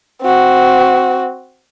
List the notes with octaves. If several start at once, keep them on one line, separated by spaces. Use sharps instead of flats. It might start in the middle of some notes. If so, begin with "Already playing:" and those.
C4 F#4